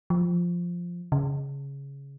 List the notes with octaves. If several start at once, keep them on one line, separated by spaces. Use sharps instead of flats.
F3
C#3